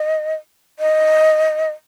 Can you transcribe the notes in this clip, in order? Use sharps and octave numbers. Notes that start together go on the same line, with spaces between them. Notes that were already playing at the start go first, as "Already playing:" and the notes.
Already playing: D#5
D#5